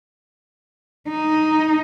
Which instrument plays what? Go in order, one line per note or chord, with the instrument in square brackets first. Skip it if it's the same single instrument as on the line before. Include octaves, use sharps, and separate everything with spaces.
[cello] D#4